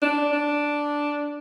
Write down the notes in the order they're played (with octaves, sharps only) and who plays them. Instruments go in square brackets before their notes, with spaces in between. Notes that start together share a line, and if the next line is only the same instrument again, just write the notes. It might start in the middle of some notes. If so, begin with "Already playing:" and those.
[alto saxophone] D4
D4